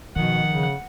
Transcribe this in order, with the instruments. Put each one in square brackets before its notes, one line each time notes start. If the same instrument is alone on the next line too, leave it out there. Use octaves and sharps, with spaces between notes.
[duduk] B2 [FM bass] D#3 [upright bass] F3 [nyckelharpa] F#5
[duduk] C#3